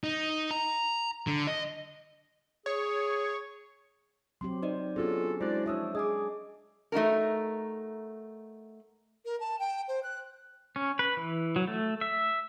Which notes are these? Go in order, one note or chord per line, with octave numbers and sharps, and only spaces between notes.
D#4
A#5
D3
D#5
G#4 C#5
F#3 C4 G4 C6
D#4 C5 D5 D#5
B3 C#4 D4 F4 F#4 G#4 A4
G#3 D4 E4 F#4 C5 D5 F#6
F3 D4 C#5 E5 D#6 E6
D4 G#4 D#5 G#5 D6
A3 D#4 F#4 A#4
A#4
A5
G5
C5
F#6
C#4
B4
E3
F#3
A3
E5